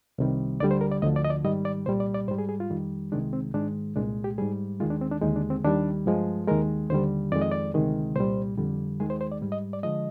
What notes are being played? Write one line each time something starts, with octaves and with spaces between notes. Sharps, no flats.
C2 C3 D#3 G3
D2 D3 G3 D5
C5
A#4
D5
D2 D3 F3 D#5
D5
D#5
D5
G#2 D#3 G3 D#5
D5
C2 A#2 G3 C5
D5
D5
G#2 G3 C5
G#4
G#4
F4
F2 D#3 G3
C2 C3 D#3 G#3 D4
C4
G#2 D#3 G#3 D4
C2 A#2 G#3 D4
G4
G#2 G3 G#4
D#2 D#3 G#3 F4
D4
C4
D4
D#2 D3 G#3 D#4
D4
C4
D#2 D#3 G3 D4
G2 F3 G#3
D#2 D#3 G#3 A#4
D#2 D3 G3 C5
F2 D#3 G#3 D5
D#5
D5
D2 C3 D#3 G#3
C2 A#2 G3 C5
F2 D3 G3
D#2 D#3 G#3 G#4
C5
C5
D5
G#2 G3
D#5
D5
D3 F3 G#3 D#5